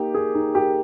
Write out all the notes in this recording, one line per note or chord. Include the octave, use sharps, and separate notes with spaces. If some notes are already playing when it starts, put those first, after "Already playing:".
Already playing: A#3 D#4 G4
A#3 G#4
D#4
A#3 G4